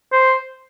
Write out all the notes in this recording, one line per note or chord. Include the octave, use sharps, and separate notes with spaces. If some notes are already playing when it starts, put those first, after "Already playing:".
C5